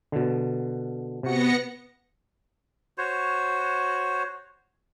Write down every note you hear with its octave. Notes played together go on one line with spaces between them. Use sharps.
B2 D3
C3 B3 F#4 A#6 C#7
F#4 C5 C#5